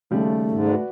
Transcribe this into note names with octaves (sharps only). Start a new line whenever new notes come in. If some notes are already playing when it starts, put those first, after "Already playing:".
D#2 C#3 G3 A3
G#2
F#4 B4 D5